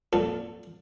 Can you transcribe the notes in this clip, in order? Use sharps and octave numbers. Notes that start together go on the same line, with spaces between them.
F2 A#2 A4